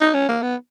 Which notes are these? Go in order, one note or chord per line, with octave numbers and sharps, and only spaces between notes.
D#4
C#4
A#3
B3